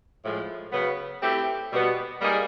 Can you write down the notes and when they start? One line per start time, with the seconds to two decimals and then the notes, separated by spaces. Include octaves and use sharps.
0.23 A2 F3 G#3
0.73 C#3 F#3 B3
1.22 A3 C4 E4 G4
1.72 B2 G3 B3
2.21 G3 A#3 D#4 G#4